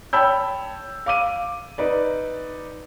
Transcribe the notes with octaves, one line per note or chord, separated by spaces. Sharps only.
C#5 G5 A5 B5 E6 G6
F5 D6 D#7
D#4 B4 D5